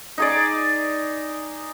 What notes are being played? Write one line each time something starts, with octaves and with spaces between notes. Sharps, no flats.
D#4 G#4 D5